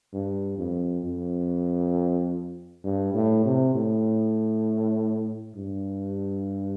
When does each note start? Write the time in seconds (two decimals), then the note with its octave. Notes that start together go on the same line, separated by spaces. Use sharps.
0.13 G2
0.58 F2
1.04 F2
2.84 G2
3.14 A2
3.45 C3
3.75 A2
5.56 G2